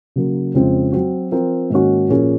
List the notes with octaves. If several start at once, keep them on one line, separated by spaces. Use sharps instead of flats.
C#3 F#3 A#3
F2 C#3 G#3 C4 F4
F#3 C4 F#4
F3 C4 F4 A#4
G#2 D#3 A#3 C#4 F#4
A#2 F3 A#3 C#4 G#4